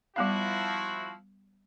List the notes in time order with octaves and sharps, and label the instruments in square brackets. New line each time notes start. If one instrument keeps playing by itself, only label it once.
[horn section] F3 E4 F#4 [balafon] G3 B3 F5